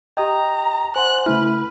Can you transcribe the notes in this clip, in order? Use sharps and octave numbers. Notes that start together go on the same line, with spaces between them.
G4 D#5 G5 A#5 D#6
C5 F#5 G#5 C6 F#6
C#3 A3 E4 B4 F6